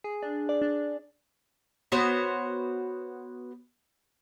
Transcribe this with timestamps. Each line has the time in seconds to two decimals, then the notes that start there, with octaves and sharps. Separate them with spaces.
0.04 G#4
0.22 D4
0.49 D5
0.62 D4
1.92 B3 F#4 C5 C#5